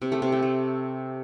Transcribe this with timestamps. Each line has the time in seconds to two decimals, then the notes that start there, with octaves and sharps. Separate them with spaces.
0.02 C3
0.12 A3
0.22 C3
0.32 A3
0.42 A3